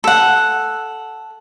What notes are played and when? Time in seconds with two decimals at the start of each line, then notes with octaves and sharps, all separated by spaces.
0.04 A4 F#5